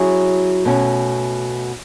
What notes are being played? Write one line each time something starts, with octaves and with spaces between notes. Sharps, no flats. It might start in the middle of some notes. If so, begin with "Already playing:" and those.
Already playing: F#3 C#4 E4 G#4
B2 A3 C#4